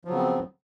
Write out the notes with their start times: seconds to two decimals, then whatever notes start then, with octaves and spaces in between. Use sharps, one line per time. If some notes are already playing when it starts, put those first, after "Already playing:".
0.05 F3
0.08 F#3
0.11 C#3
0.13 B3
0.16 C4